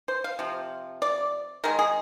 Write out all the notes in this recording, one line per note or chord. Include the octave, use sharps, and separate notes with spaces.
C5
F5
C3 F3
D5
D#3 G#3 A#4
G#4